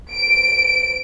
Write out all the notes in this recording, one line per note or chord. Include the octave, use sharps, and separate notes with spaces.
D7